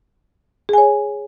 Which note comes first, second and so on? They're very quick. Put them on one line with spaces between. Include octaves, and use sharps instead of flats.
G#4 G#5 C#5